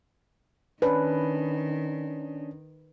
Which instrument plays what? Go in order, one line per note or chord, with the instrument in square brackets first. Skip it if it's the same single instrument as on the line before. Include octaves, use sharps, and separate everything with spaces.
[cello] D#3 [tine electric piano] C#4 D4 [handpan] B4